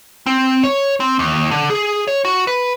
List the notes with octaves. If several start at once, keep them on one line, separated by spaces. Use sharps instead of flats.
C4
C#5
C4
D#2
D3
G#4
C#5
F#4
B4